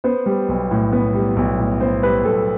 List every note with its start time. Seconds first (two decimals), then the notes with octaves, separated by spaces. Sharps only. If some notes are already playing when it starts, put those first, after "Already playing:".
0.04 B3 C5
0.26 G3
0.49 B1
0.71 A2
0.92 B3
1.14 G3
1.37 B1
1.59 A2
1.80 B3 C5
2.03 G3 B4
2.25 B1 A4